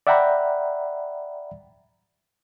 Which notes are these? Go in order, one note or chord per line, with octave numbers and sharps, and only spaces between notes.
D5 E5 F#5 G5 A#5 B5